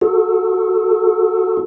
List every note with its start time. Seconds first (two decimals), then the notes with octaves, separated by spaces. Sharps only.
0.01 F#4 A4